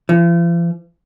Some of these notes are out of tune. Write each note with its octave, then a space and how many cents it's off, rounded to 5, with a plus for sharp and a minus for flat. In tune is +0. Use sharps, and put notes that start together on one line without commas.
F3 -45